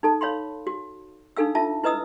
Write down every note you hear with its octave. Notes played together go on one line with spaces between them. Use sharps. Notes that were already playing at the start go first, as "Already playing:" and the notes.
D#4 A4 A5
C#5 F5 B5 C6
F#4
D4 D#4 A4 F5 E6
F4 E5 A5
E4 B4 D#5 D#6 E6